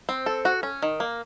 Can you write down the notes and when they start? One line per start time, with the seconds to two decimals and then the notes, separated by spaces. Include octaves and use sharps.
0.09 C4
0.26 A4
0.45 F#4
0.63 C#4
0.82 D#3
1.00 A#3